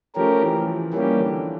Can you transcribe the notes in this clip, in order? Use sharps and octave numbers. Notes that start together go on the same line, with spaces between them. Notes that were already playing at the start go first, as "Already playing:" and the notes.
F3 A3 C#4 G4 A#4
E3
F3
E3 G3 A#3 C#4 G4
D3